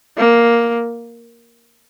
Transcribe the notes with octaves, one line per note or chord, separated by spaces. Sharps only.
A#3